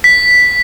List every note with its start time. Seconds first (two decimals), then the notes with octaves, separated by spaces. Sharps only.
0.04 B6